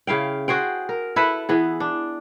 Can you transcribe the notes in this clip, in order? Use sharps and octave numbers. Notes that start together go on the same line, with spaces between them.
C#3 E4 F5 G5
F#4 G#4 C5 G5
A#4
E4 A4 B4 E5
E3 B3 G#4
D4